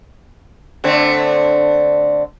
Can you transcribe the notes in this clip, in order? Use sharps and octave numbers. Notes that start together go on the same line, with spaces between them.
D3 A3 C4